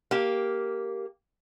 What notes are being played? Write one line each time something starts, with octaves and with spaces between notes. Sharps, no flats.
A#3 G4